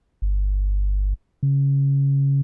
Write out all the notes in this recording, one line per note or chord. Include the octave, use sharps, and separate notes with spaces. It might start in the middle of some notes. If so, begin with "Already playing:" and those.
G1
C#3